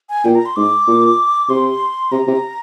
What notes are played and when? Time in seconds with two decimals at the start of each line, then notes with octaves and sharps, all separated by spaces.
0.09 G#5
0.24 A#2 G5
0.35 A#5
0.46 C6
0.56 G#2 D6
0.88 A#2
1.49 C3 C6
2.12 C3 A#5
2.28 C3